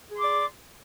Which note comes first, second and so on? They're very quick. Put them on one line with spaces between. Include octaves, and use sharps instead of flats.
G#4 C6 D6 D5